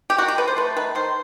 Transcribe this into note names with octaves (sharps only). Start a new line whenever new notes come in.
G4
D#3 F#4
G4
A3 B4
C5
A3 B4
D#3 B4
D#3 C5